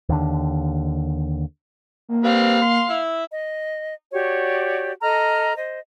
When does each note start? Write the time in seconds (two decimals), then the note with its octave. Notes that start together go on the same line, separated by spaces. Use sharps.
0.09 D#2 D3
2.09 A#3
2.24 G3 C4 B4 F5
2.61 C6
2.90 E4 E5
3.32 D#5
4.13 F#4 G4 C#5 D5
5.02 A4 D#5 A#5 F6
5.57 C5 D#5